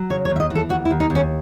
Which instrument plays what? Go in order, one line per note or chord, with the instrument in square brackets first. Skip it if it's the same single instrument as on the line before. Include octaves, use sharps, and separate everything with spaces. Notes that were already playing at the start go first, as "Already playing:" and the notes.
Already playing: [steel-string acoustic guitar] F#3
C#3 C#5
C#5
D#2
E5
D#5
E3
A4
D#2 F#4
E4
D#2
D#4
D#2
C#4